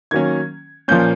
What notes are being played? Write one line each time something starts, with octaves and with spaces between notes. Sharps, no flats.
D#3 F#3 A#3 C#4 G#6
A#2 F3 A#3 C#4 G6